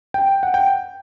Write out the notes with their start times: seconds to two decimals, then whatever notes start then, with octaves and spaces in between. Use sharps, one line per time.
0.14 G5
0.43 F#5
0.54 G5